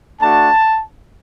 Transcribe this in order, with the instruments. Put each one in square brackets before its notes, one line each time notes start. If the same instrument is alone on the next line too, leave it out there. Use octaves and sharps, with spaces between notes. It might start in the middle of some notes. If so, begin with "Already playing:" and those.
[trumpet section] A3 D4 F#4 A5